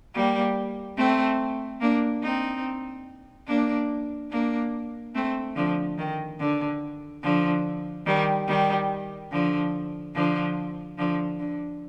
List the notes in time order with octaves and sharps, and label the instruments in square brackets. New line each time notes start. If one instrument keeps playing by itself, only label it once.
[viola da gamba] G3 A#3
A3 C4
A#3 D4
C4 D#4
A#3 D4
A#3 D4
A3 C4
D3 F3
D#3
D3
D3 F3
D#3 G3
D#3 G3
D3 F3
D3 F3
D3 F3
D3